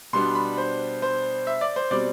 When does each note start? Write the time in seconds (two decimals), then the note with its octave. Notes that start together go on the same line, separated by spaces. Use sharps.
0.13 B2 G3 B3 D4 C6
0.35 B5
0.58 C5
1.02 C5
1.47 E5
1.61 D5
1.76 C5
1.91 B2 G3 C4 D5